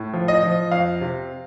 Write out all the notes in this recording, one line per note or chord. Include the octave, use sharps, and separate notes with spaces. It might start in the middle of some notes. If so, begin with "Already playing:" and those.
Already playing: A2
F3
D#5
F3
F2 F5
C3